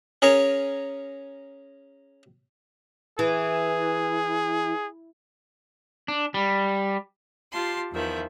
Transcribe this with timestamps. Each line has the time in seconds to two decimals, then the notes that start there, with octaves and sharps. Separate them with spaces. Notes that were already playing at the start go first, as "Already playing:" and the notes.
0.22 C#4 G#4 A#4 C#5
3.19 E3 G#4
6.08 D4
6.34 G3
7.52 F4 G4 A5 C6
7.91 E2 D#3 F3 E5